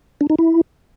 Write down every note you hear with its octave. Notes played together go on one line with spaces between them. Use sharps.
D4
D#4
E4